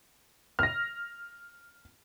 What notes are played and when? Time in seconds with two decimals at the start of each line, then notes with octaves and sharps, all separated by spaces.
0.59 F6 A#6